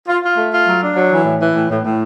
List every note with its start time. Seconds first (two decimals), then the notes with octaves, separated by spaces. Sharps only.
0.08 F4
0.23 F4
0.37 A3
0.52 F4
0.66 F#3
0.81 D4
0.96 F#3
1.11 E3
1.25 A2
1.40 E3
1.55 A2
1.70 A2
1.84 A2